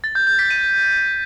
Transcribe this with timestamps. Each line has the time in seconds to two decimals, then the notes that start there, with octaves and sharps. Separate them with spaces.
0.04 A6
0.15 G6
0.27 G6
0.39 B6
0.50 D#7